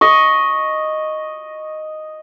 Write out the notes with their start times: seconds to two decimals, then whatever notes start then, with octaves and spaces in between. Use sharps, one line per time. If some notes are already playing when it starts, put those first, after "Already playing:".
0.01 D#5 C#6